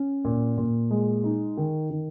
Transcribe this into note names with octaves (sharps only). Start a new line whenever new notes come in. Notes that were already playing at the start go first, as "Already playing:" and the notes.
Already playing: C#4
A#2
A#2
G#3
D#4
D#3
D#3